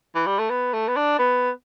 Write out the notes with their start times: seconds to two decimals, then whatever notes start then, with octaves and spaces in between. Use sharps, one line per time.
0.15 E3
0.26 G3
0.39 A3
0.50 B3
0.73 A3
0.88 B3
0.96 D4
1.19 B3